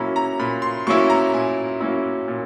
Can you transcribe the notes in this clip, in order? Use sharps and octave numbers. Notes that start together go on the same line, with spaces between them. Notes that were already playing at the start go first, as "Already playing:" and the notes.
Already playing: A#2 F#3 A#3 C#4 E4 A#5 B5
A#5
A#2 B5
C6
F#3 A#3 C#4 E4 C#6
A#5
A#2 G#5
F#3 A#3 C#4 E4
A#2